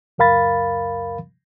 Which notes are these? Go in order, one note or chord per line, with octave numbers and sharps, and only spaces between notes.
C#2 F#2 A#4 F5 B5 A6